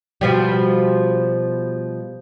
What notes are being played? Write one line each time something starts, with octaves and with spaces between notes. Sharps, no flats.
B2 F3 G3